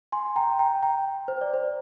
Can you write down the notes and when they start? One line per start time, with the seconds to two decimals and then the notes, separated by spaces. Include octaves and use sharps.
0.12 G#5 C6
0.36 G5 A#5
0.59 G5 A#5
0.82 G5 A#5
1.28 C5
1.41 D5
1.54 C5